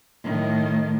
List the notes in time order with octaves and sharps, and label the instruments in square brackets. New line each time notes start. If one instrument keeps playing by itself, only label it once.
[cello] A2 D#3